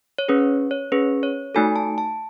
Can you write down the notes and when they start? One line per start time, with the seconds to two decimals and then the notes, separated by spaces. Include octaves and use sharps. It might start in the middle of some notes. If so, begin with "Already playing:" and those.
0.18 C#5
0.28 C#4 G#4 B4
0.71 C#5
0.92 C#4 G#4 B4
1.23 C#5
1.55 A3 D#4 F#4 A4 G#5
1.76 A5
1.98 A5